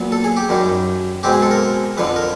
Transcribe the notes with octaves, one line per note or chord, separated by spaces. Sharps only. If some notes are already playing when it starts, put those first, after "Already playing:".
Already playing: A#2 F#3 B3
A4
G#4
G4
F#2 D#3 G3
B2 G#3 C4 G4
G#4
A4
A#4
F2 D3 F3 B4
A#4